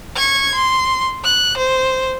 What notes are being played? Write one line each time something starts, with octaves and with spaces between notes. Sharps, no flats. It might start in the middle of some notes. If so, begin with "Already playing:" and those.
C#6 G#6
C6
F#6
C5